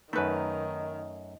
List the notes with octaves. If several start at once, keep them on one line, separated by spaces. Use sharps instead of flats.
F#2 D#3 A3 D#4 B4